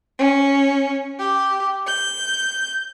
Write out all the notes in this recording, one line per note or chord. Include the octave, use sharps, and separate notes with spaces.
C#4
G4
G6